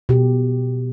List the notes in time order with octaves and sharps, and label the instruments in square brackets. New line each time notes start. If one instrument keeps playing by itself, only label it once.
[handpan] B2 G4